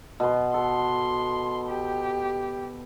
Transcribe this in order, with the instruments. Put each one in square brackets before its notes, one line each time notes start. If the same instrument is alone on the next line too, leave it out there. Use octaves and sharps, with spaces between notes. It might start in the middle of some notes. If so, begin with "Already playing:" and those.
[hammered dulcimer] B2 B3 C6
[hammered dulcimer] A4 [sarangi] C6
[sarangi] G4